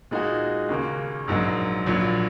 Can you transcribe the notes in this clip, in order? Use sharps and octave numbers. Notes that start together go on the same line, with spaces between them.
A#2 G#3 D#4 F#4
D#2 C#3 A#3
A#1 G#2 F#3 A#3
A#1 A#2 F#3